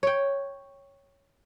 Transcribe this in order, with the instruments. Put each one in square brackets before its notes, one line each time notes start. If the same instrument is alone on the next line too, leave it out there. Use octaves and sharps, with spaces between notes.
[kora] C#5 G5